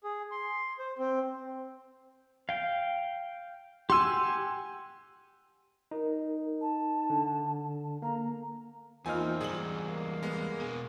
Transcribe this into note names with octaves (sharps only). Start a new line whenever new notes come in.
G#4
C6
C5
C4
F5 G5
G4 F#5 G#5 C6 E6
D#4 A#4
A5
D3
A#3 A#5
E2 F3 A#3 C4 D#4 G#5 F6
E2 G#2 G3 G#4 F#7
A#3
G#3 B3
B2 G#4